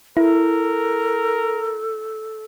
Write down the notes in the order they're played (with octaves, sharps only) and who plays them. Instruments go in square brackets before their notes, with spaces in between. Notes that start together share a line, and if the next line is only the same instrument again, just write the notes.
[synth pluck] E4 [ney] A4 [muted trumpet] A#4